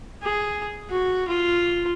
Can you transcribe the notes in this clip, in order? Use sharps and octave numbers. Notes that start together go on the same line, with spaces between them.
G#4
F#4
F4